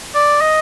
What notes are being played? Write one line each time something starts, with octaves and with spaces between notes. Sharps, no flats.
D5
D#5